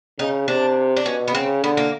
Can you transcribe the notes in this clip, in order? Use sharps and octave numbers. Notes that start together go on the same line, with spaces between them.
C#3 D#4
C3 D4
D4
B2 C#4
B3
C#3 C4
D3 B3
A#3